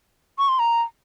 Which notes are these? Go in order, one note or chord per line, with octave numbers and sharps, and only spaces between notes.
C#6
C6
A#5